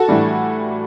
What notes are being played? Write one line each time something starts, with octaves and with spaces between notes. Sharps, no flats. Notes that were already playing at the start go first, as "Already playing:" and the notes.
Already playing: F#4 A4
A2 E3 G3 D4